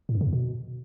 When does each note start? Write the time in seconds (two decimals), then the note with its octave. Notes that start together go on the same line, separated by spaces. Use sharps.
0.09 A2
0.15 F#2
0.21 C#3
0.27 E2
0.33 B2